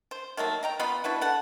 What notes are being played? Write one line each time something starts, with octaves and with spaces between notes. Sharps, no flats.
C5
D#3 F#3 A3 A#3
D#5 G5 A#5
B3 F4 D#5 B5
D4 E4 F#4 B4
A4 F#5